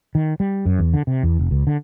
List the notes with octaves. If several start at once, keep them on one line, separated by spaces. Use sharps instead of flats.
D#3
G3
F#2
E2
D3
C3
E2
F1
C#2
D3